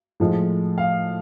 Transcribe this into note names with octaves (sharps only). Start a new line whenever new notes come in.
A2 F3 G#3
F5